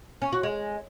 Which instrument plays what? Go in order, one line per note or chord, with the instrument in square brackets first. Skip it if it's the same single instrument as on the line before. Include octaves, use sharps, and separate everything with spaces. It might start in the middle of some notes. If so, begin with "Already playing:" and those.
[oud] C#4
F#4
G#3